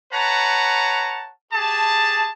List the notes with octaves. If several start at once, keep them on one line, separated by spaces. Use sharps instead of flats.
B4 C#5 F#5 A5 A#5
G4 G#4 A5